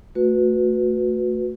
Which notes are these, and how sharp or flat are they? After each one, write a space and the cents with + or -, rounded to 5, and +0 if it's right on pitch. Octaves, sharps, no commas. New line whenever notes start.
A3 +20 F#4 -15 B4 +0